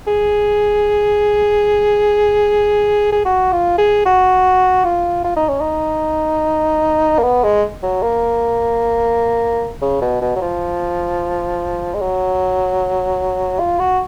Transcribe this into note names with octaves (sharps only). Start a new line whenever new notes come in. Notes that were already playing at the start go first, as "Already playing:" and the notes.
G#4
G#4
F#4
F4
G#4
F#4
F4
F4
D#4
C#4
D#4
A#3
B3
G#3
F#3
A#3
C#3
B2
B2
F#3
F3
G#3
F#3
F4
F#4